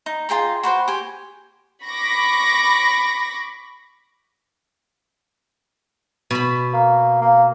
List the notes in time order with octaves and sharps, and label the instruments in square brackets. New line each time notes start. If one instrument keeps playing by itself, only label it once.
[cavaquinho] D#4
F4 G#4 G5 A#5
F#4 B4 C5 G5
G4 G#5
[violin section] B5 C#6 D6 A#6
[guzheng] B2 B5
[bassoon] A#3
A#3